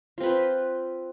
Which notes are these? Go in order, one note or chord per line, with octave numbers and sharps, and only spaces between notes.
C4 F4 B4 C5